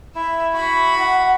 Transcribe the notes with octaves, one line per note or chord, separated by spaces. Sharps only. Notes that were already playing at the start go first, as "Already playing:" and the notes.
E4 E5
F#4 B5
F#5